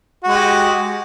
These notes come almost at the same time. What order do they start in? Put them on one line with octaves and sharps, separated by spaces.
F#4 G#3 G4